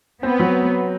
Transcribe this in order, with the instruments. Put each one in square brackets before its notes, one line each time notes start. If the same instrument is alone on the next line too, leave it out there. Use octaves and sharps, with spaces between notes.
[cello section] B3 [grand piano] C4
[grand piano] F#3